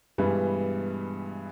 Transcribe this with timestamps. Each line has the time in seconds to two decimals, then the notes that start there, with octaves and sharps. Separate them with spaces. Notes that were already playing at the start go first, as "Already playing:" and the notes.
0.18 G2 B2 E3 G3 G#3 B3